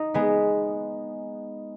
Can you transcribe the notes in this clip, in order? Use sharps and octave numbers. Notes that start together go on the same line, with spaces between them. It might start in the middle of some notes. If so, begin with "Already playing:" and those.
Already playing: D#4
G#3 B3